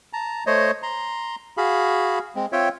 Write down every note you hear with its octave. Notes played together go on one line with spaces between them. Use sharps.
A5 A#5
A3 C5 C#5 D#5
A#5 C6
F#4 G#4 F5 B5
G#3 C4
C4 F4 C#5 E5 G5